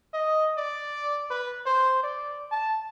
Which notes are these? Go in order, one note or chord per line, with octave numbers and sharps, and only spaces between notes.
D#5
D5
B4
C5
D5
A5